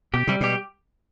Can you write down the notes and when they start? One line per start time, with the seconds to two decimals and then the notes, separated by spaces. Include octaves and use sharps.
0.13 B2 G4
0.27 C3 G3
0.41 B2 G4